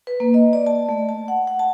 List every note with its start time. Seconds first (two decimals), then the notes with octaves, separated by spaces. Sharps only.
0.07 B4
0.20 A#3
0.34 D#5
0.53 D5
0.67 A5
0.89 A3
1.09 A5
1.28 F#5
1.47 F#5
1.59 A5